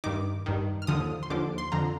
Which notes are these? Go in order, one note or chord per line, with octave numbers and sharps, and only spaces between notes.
G2 D#3 D6
G2 D#3
F6
D#2 D3 F3 D#6
C6
D#2 D3 F3 D6
C6
F2 D3 F3 A#5